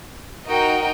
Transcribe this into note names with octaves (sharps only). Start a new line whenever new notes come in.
D#4 F#4 A#4 D#5 G5